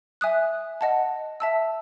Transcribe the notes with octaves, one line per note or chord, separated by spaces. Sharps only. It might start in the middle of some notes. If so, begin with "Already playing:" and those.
E5 G#5 D#6 F#6
D#5 F#5 A5
E5 A5 E6